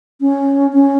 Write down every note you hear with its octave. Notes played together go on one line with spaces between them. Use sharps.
C#4
C#4